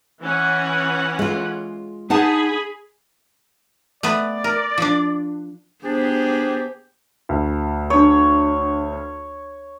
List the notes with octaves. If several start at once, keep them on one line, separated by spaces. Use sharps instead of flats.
E3 C#4 F#5
G#3 F4
D#4 G#4 F#5 A5 B5
A3 B3 B4 D5
A#4
F3 D4
B3 D4 G4 G#4 C5
D2
D4 C#5 C#6 D#6
B4